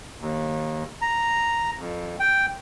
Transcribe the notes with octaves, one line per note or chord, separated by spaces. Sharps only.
D#2
A#5
F2
G5